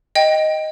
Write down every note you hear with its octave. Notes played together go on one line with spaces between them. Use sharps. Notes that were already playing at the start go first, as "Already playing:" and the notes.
D#5 G5